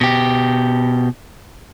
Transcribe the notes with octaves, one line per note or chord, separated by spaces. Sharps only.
B2 G4